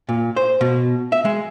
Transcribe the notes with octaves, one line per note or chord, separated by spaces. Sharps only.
A#2
C5
B2
E5
G#3